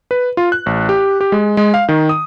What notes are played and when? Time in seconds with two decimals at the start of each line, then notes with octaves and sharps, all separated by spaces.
0.11 B4
0.37 F4
0.52 F#6
0.66 A1
0.89 G4
1.21 G4
1.32 G#3
1.57 G#3
1.74 F5
1.89 D#3
2.09 D#6